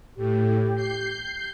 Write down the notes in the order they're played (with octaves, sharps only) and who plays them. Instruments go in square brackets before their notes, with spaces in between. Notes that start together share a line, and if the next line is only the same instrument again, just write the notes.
[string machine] A2 [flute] G4
[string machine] G6 C7